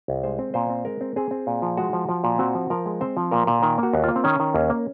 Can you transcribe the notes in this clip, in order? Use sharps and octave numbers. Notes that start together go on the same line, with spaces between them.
C2
G#3 C5
C4
A#2 C5
C4
G#3 A#4
C4
C4 G#4
C4
A#2
F3
G#3 F#4
F3
F3
A#2
C4 F#4
F3
F3 A#4
G#3
C4 C5
F3
A#2 A#4
A#2
D#3 A#4
A#3 F#4
D#2
A#3 F4
C4
D#3 C#4
D#3
D#2
A#3